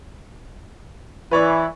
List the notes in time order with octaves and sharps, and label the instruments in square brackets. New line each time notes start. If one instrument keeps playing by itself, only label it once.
[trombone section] E3 [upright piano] B4 C#5 D5